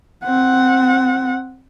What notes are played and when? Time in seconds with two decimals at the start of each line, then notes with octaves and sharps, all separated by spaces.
0.24 C4 F#5